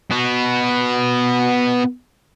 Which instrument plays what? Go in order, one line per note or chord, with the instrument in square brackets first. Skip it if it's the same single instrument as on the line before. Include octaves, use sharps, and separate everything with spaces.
[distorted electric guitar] B3 F#4